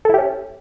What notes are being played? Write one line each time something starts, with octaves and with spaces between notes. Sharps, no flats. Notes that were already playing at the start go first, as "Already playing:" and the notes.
C#4 E4 G4 A4